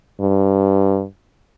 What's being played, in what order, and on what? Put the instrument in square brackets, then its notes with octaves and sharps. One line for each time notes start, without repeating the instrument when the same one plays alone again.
[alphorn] G2